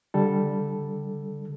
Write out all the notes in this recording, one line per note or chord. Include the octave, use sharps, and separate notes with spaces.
D3 G3 A4